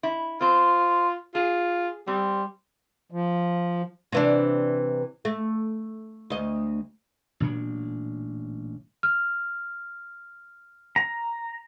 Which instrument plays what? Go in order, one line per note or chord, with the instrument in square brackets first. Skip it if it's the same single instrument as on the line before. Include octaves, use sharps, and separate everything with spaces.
[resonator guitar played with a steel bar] E4
[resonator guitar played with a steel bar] C4 C5 [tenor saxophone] F4
[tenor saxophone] F4 [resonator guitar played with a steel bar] G#4
[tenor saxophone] G3 [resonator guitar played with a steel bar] C4
[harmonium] F3
[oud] C3 E3 D4
A3
D2 D#5
[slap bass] A1 A#2 F#3 D4
[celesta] F6
[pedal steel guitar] A#5